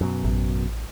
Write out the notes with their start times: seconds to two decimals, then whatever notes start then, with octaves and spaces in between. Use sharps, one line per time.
0.01 F#2 B2
0.24 A1